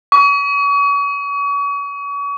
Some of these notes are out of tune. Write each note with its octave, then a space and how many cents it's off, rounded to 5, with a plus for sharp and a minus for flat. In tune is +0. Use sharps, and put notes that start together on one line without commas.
C#6 +40